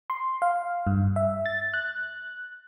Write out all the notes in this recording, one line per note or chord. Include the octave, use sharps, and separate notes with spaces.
C6
F5
G2
E5
A6
F#6